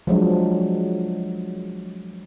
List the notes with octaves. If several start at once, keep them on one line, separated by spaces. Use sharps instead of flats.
F3 F#3 G#3 D4